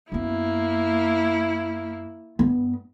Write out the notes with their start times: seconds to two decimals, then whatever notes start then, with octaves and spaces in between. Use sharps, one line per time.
0.12 F#2 A#3 B3 E4
2.39 G2 B3